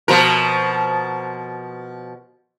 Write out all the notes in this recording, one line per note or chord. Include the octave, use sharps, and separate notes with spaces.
B2 F3 A#4